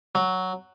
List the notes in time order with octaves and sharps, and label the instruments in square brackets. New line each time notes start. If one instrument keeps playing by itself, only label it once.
[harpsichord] F#3